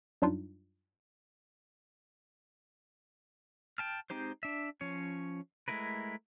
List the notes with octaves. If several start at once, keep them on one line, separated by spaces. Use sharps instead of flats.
F#2 F#3 G3 D4 D#4 F4
G5 A5 F6
G#3 C4 D#4 G4 C5
D4 E5
F3 C#4 C#5
G#3 A3 E4 A#4 B4